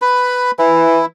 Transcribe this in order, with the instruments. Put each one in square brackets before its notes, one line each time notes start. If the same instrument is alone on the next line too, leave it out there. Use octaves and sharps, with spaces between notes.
[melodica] B4 B5
[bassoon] E3 [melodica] E4